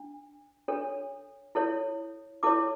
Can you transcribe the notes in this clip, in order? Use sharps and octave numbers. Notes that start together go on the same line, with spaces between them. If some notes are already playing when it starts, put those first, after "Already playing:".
Already playing: D4
D4 A4 C#5
E4 A4 C#5
E4 A4 C#5 D6